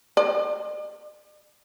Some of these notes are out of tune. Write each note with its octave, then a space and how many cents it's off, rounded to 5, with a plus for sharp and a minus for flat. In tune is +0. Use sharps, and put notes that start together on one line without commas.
D5 +45